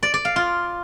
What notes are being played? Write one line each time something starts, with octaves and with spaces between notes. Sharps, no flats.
D5
D5
F5
F4